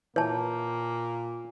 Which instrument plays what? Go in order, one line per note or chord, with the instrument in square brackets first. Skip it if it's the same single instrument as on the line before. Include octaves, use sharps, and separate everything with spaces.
[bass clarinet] A#2 [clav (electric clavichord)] E3 [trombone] A#3 [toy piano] C#5 A5